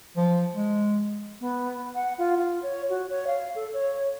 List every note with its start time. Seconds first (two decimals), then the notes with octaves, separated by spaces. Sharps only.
0.17 F3
0.54 G#3
1.40 B3
1.95 F#5
2.18 F4
2.38 F4
2.62 C#5
2.89 F#4
3.10 C#5
3.27 F5
3.55 A4
3.73 C#5